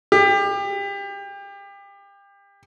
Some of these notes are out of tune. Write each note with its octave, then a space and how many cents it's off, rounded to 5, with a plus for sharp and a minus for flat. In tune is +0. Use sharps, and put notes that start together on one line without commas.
G4 +30